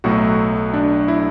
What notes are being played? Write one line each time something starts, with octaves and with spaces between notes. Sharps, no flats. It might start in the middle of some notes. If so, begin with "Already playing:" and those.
B1 A2 F#3 A3 F#4
D4
E4